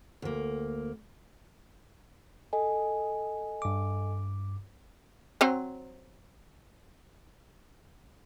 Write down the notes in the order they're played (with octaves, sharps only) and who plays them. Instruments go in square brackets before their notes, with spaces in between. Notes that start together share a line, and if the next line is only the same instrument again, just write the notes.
[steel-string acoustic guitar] D2 A#3
[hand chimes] A4 D#5 G#5
[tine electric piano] G2 D6
[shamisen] F#3 C4 C5